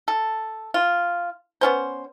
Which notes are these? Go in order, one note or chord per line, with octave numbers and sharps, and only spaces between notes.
A4
F4
B3 C#4 C5